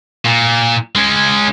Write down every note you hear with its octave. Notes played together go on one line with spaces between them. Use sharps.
A#2
G#3 C#4